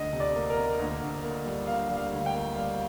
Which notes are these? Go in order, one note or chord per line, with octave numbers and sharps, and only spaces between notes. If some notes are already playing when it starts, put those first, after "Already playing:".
Already playing: D2 D#5
C3
D5
A#3
A#4
A#3
D2 A#4
D2
A#3
G3
A#3 F5
G3
F5
D2
G5
A#3
G3 F5